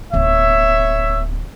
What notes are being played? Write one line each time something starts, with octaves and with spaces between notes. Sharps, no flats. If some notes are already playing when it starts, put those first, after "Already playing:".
D1 B3 C#5 E5